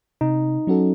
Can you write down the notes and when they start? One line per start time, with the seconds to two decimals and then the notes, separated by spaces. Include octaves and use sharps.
0.21 C3 D#4
0.67 F#3 C#4 F#4 A4